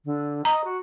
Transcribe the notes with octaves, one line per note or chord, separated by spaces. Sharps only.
D3
D#5 A#5
F#4